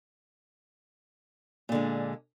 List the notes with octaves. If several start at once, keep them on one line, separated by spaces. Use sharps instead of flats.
A#2 D3 G#3